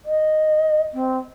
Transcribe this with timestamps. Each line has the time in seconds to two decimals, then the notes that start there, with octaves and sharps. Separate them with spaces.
0.05 D#5
0.94 C4